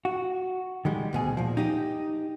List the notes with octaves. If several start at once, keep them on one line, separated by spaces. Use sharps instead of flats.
F#4
D#3 G3 G#3
D2 B2 G#4
A#2 F3
D#4 G4 D#5